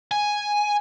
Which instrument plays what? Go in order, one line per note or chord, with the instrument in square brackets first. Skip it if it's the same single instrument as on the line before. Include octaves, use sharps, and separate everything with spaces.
[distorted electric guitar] G#5